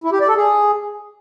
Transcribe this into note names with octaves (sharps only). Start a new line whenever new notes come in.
E4
G4
D5
A4
G#4